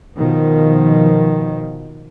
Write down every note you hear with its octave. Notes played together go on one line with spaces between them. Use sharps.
B2 D#3 F3